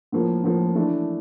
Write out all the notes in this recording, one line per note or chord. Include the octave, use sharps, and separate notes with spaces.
A2 F3 A#3
A2 F3 A#3
E3 A3 D4